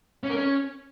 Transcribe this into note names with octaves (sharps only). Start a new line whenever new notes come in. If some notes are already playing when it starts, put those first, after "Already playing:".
C#4
A#4
C#4